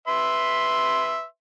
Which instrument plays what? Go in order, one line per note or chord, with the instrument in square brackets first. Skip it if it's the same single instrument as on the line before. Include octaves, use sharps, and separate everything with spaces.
[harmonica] B4 E5 C6